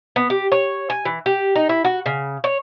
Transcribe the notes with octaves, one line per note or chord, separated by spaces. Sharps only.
B3
G4
C#5
G#5
E3
G4
D#4
E4
F#4
C#3
C#5